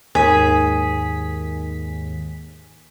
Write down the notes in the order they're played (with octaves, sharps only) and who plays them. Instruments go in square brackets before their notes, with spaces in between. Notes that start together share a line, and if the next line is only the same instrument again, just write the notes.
[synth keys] D#2 G#2 B6 [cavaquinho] G#4